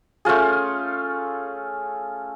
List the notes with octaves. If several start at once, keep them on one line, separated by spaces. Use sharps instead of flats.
A3 C#4 F4 G#4